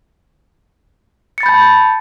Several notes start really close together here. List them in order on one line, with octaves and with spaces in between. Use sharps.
C#7 A6 B5 G6 A5